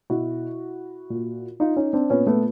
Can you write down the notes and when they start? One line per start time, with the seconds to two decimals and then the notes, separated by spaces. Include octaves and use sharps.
0.10 B2 E4 F#4
1.10 A#2
1.60 D#4 F4
1.76 C#4 D#4
1.93 C4 D4
2.10 A#2 B3 C#4
2.27 A3 B3